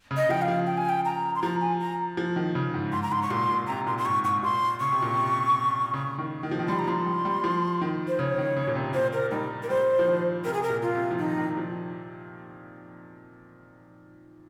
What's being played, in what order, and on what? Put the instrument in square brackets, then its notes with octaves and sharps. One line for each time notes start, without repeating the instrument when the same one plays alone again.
[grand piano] C#3
[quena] D#5
[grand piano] F3 [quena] G5
[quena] F5
[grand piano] F3
[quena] G5
G#5
G5
A#5
C6
[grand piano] F3 [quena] A#5
[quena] G#5
A#5
[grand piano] F3
D#3
C#3
G#2
[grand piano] G#2 [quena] C6
[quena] A#5
[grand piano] G#2 [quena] C6
[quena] C#6
[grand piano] A#2 [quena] C6
[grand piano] A#2
[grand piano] C3 [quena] A#5
[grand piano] A#2 [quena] C6
[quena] C6
[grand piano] G#2 [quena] C#6
[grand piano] G#2 [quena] C#6
[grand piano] A#2 [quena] C6
[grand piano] C#3 [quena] C#6
[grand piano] C3
A#2
C3
C#3
D#3
D#3
F3
D#3
[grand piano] G3 [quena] C6
[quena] A#5
[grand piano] F3 [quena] C6
[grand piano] G3
G3
F3
D#3
[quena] C5
[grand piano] C#3 [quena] C#5
[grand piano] D#3
C#3
A#2
C3
[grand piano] A#2 [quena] C5
[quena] A#4
[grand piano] G3 [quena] D#4
[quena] A#4
[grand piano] G3 [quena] C5
[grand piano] F3
D#3
[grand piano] C3 [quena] A#4
[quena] G#4
A#4
[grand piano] A#2
[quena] F4
[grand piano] C3
F3
[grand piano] D#3 [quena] D#4
[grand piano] D#3
F3